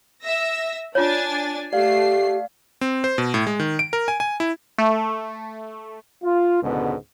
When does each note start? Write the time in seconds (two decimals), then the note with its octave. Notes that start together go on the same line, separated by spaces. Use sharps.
0.22 E5 E6 A#6
0.95 D4 F4 C#5 G#5 A6
1.73 A3 G4 D5 F5 C7
2.81 C4
3.04 C5
3.18 B2
3.34 A2
3.47 G#3
3.60 D#3
3.79 D7
3.93 A#4
4.08 G#5
4.20 G#5
4.40 E4
4.78 A3
6.23 F4
6.63 C#2 G#2 B2 D3 B3